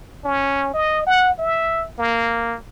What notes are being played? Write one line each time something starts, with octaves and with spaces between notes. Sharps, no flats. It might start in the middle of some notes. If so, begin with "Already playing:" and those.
C#4
D#5
F#5
E5
A#3